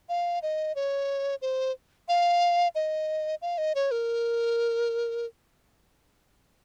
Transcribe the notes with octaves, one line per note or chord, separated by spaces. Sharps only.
F5
D#5
C#5
C5
F5
D#5
F5
D#5
C#5
A#4